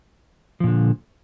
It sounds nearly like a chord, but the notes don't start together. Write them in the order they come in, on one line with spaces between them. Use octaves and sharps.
F3 A#2 D3